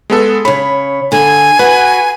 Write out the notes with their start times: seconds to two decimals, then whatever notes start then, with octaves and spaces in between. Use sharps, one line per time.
0.10 G#3 B3 A4
0.45 C#3 C#5 B5
1.12 D3 A4 G#5
1.59 F#4 B4